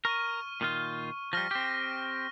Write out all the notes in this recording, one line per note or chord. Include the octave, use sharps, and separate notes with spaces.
A#4 C#6 F6 D#7
A#2 D#3 F4
F3 G3 F6 A#6
C4 G4